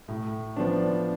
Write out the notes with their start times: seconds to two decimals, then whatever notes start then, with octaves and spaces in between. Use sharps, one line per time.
0.08 A2
0.56 F3 B3 D4